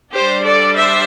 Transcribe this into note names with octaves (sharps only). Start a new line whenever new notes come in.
D4 G4 C5
G3
A4 D5
C5 E5